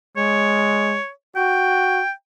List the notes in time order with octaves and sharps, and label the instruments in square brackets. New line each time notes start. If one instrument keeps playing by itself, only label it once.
[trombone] G#3 [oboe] C#5
[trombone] F#4 [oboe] G5